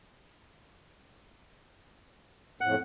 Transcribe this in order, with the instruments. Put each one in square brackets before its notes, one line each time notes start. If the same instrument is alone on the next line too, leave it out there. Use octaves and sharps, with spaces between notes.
[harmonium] F2 A2 [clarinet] F#5